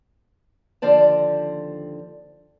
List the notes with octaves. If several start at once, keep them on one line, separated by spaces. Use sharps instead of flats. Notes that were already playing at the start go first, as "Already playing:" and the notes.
D#2 D3 F3 C4 D5 A5